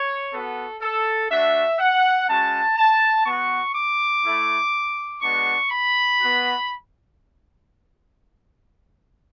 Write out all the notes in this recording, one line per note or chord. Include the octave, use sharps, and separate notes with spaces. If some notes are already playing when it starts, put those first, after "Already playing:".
Already playing: C#5
B3 F#4 A4
A4
A3 D4 F#4 E5
F#5
G#3 C#4 F#4 A5
A5
B3 F#4 C#6
D6
A3 E4
G#3 B3 D4 F#4 C#6
B5
B3 F#4